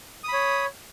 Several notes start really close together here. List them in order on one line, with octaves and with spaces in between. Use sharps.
D#6 B5 C#5